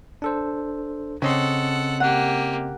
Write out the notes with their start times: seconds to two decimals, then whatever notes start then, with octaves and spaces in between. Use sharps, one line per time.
0.22 D4 A4 C5
1.22 C#3 C4 A4 D#5 F#5 C6
2.00 A#3 G4 F#5